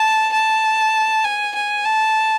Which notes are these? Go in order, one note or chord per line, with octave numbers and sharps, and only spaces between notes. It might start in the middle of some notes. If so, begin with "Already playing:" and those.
Already playing: A5
A5
G#5
G#5
A5